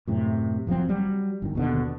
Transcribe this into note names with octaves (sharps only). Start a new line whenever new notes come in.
F#2 A2 C3
F#1 F3 F#3 C4
F#3 G3
G1 D#3
D#2 B2 D3